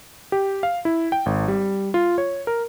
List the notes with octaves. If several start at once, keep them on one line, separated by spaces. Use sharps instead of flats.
G4
F5
E4
G5
G#1
G3
F4
C#5
A#4